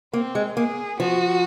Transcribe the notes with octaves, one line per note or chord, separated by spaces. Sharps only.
A#3 C4
G#3
A#3 G#4
F3 F#4